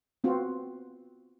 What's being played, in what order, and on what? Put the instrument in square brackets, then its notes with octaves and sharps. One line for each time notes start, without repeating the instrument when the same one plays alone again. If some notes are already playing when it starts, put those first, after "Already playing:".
[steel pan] B3 C4 F4 F#4